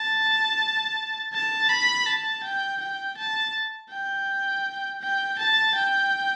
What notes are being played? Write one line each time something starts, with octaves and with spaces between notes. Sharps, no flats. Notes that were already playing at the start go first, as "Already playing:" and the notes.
Already playing: A5
A5
B5
A5
G5
G5
A5
G5
G5
A5
G5